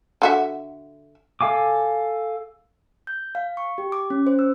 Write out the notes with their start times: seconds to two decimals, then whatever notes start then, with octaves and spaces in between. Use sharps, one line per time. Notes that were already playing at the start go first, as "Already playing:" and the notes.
0.22 D3 F#4 E5
1.41 A4 F5 G#5 D6
3.07 G6
3.35 F5
3.57 C#6
3.78 G4
3.92 D6
4.10 C#4
4.27 C5
4.39 E6